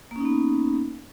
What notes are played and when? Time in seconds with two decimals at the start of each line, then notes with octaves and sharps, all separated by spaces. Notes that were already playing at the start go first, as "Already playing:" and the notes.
0.11 A#3
0.16 C#4
0.20 D#4
0.25 B3